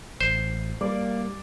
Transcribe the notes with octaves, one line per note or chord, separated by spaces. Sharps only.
A1 C5
G3 A#3 D5